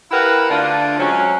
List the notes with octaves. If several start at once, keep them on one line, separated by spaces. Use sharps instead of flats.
E4 G4 A#4 B4 F5 F#5
D3 A3 D4 F4
F#3 G#3 C4 C#4